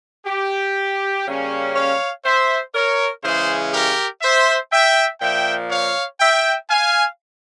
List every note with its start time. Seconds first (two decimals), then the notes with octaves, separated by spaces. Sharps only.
0.26 G4
1.26 C#3 G3 A#3 C#4
1.75 C#5 F5
2.25 C5 E5
2.75 A#4 C#5
3.23 C#3 E3 G#3 C#4 G#4 C5
3.73 G4 A#4
4.22 C5 E5
4.72 E5 G5
5.21 A#2 F3 A#3 E5 G5
5.71 C#5 F5
6.20 E5 G5
6.70 F5 G#5